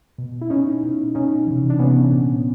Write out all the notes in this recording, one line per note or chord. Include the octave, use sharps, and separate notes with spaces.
B2
E4
B2 C#4 D#4
B2
B2 C#4 D#4
C3 E3
D4
C3 E3 B3 C#4
A#2